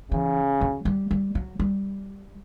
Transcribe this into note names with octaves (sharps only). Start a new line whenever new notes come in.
C#3 E3
F#3
G3
G3
F#3
G3